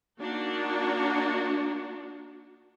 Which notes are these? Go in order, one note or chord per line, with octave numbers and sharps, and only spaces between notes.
A#3 D4 D#4 F#4